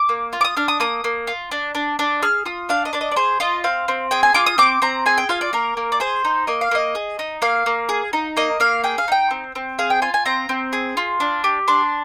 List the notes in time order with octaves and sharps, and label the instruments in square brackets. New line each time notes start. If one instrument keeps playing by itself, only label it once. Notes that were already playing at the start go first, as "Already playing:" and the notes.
Already playing: [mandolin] D6
A#3
F4
D6
D#6
D4 F6
D#6
A#3 D#6
A#3
F4
D4
D4
D4
G#4 F6
F4 D#6
D4 F5
D#5
D4 D5
D#5
D5
G#4 C5
F4 D#5
C4 F5
C4
G#4 G5
G#5
F4 D6
D#6
C4 D6
C4 A#5
G#4 G#5
G5
F4 F5
D5
A#3 A#4
A#3
D5
G#4 C5
D#4
A#3 D#5
F5
A#3 D#5
G#4
D#4
A#3 F5
A#3
G#4
D#4
A#3 D#5
A#3 F5
G#4 G5
F5
D#4 G5
C4
C4
G#4 F5
G5
F4 G#5
G#5
C4 A#5
C4
G#4
F4
D4
G4
D4 C6